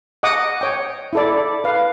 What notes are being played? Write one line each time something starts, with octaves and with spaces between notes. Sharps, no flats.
D#5 F#5 D6 D#6
C#5 G5
E4 A4 D5
B4 F5